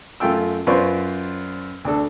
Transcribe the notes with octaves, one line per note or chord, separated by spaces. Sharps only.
F#2 A3 F4 G5 E6
F#2 F4 B4 C5 D5 C#6
D2 D4 A4